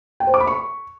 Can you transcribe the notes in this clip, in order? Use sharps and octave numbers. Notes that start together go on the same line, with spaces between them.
G5
C5
D6
B5
C#6